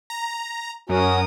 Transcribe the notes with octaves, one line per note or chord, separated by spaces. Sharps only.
A#5
F#2 C#4 F#4 A#4 D#6